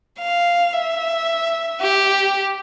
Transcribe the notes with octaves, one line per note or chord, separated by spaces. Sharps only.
F5
E5
G4